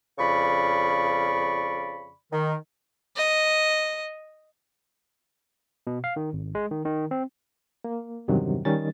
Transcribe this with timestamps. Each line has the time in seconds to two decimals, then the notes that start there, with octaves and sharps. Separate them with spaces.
0.18 F2 C#3 D5 B5 C#6
2.32 D#3
3.16 D#5
5.87 B2
6.04 F5
6.16 D#3
6.33 G#1
6.55 G#3
6.71 D#3
6.85 D#3
7.11 C4
7.84 A#3
8.28 E2 G2 C3 D#3 F#3
8.65 D#3 G3 C#4 A6